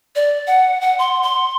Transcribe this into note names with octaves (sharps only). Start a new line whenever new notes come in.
D5
F#5
F#5
C6
C6